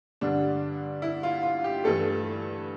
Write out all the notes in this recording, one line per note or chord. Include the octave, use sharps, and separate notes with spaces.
G2 D3 G3 D4
E4
F4
F4
G4
G2 E3 A3 A4